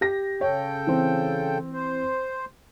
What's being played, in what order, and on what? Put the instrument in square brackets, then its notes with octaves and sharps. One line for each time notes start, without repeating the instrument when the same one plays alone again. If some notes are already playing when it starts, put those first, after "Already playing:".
[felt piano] G4 A#6
[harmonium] C#3 A4 G5 [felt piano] C#5
[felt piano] E3 C4
[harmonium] C5